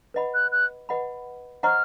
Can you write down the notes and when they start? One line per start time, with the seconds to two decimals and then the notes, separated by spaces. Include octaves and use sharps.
0.14 B4 D#5 F#5 B5
0.34 F#6
0.51 F#6
0.89 B4 D#5 F#5 B5
1.63 C5 D#5 F#5 A#5 C#6 F6